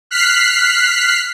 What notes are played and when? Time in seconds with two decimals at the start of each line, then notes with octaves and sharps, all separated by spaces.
0.11 F6 F#6 B6 C7